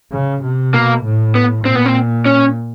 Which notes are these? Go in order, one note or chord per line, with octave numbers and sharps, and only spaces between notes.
C#3
C3
B2 A#3
A2
B3
A#2 C4
B3
C4
C#4